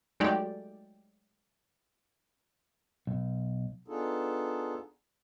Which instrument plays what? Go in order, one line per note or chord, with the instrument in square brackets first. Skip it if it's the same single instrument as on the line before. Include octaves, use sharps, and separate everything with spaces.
[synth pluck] F#3 G#3 A3 D#4 G4 D5
[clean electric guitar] B1
[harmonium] B3 D4 D#4 F4 G#4 A4